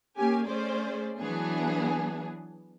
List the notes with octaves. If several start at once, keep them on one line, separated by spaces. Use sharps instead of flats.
A#3 C#4 G4 G#5
A3 C#4 G#4 C5 D5
E3 F#3 B3 D4 G#4